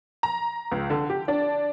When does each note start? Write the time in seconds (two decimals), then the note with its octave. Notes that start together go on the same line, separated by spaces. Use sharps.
0.23 A#5
0.72 C#2
0.90 D3
1.10 G4
1.28 D4